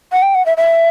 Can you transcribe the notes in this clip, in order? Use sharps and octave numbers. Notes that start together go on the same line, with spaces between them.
F#5
G5
F#5
E5
E5